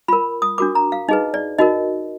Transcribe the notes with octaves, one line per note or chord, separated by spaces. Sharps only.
F4 A#4 B5
D#6
D4 F#4 A#4 D6
A#5
F5
D#4 G#4 B4 D#5
D5
D#4 F#4 A#4 D#5